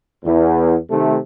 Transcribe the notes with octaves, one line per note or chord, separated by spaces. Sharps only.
E2
C3 D#3 A3